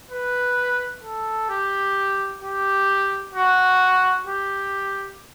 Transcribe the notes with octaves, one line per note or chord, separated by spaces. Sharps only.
B4
A4
G4
G4
F#4
G4